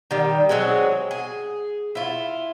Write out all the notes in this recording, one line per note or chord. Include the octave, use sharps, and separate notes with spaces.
D#3 G3
F#3 G#3 C4 G#4
G#4
E4 F4